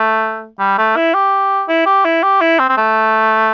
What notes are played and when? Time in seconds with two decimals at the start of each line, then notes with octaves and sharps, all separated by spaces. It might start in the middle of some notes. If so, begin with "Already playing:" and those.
Already playing: A3
0.59 G3
0.78 A3
0.96 E4
1.14 G4
1.69 E4
1.86 G4
2.05 E4
2.23 G4
2.41 E4
2.59 C4
2.69 C4
2.77 A3